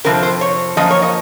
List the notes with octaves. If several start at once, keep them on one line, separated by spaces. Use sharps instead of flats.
F2 C3 F3 C4 A#4
C5
C#5
F#2 F3 A#3 D#5
C#5
D#5